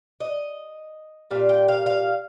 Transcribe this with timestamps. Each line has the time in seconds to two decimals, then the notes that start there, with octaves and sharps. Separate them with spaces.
0.20 D#5
1.31 A#2 G3 F5
1.49 G5
1.68 F5
1.86 F5